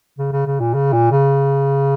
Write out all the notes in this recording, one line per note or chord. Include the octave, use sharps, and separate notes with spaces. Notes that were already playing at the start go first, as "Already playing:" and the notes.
C#3
C#3
C#3
A#2
C#3
A#2
C#3